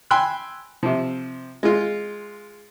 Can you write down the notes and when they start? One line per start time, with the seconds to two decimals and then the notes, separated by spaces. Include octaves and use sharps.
0.11 G5 G#5 B5 C6 E6 F#6
0.83 C3 F3
1.63 G#3 F4